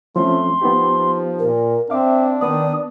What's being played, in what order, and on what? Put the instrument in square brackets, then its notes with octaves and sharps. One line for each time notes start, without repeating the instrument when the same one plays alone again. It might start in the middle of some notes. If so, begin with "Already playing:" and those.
[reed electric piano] F3 C4 C#4 [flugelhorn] A3 [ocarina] C6
[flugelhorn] F3 [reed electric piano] B3 D#4 G4
[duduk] A#2 [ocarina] A#4
[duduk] C4 [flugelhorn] D4 [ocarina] E5 [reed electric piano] F5 D6
[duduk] D#3 [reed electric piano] B3 D5 [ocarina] D#6